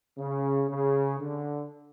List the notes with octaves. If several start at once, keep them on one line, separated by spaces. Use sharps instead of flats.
C#3
C#3
D3